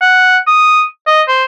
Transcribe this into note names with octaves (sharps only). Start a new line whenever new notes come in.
F#5
D#6
D#5
C5